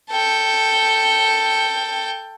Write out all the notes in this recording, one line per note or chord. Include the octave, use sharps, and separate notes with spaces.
A4 G5